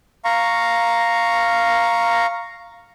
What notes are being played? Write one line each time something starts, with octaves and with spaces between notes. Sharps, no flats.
F5 A#5 C#6